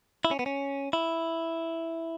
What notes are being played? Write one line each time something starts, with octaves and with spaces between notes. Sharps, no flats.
E4
C#4
B3
C#4
E4